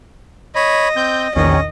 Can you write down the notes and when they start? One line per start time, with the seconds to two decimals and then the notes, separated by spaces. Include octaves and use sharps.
0.56 C#5 D#5 B5
0.96 C4 G6
1.35 A#1 E2 D#3 C#4 D#5